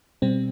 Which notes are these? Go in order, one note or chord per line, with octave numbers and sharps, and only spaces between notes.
B2 G3 C4